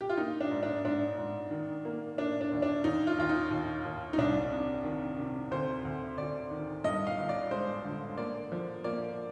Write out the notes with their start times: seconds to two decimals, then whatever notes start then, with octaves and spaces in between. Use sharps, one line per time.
0.01 G4
0.09 F4
0.17 A#3 D#4
0.41 D4
0.51 G#2
0.63 D4
0.84 G#2 D4
1.18 G#2
1.51 D#3
1.85 A#3
2.18 A#3 D4
2.41 D4
2.52 D#2
2.62 D4
2.84 D#2 D#4
3.07 F4
3.18 D#2 F4
3.29 D#4
3.51 D#2
3.85 D#2
4.13 D#4
4.18 C2 D4
4.51 C3
4.84 D#3
5.19 C3
5.51 D2 C5
5.85 D2
6.18 D2 D5
6.51 D#3
6.84 G2 D#5
7.07 F5
7.18 G1
7.29 D5
7.51 G#3 C5
7.85 D3
8.18 A#3 D5
8.52 F3
8.84 A#3 D5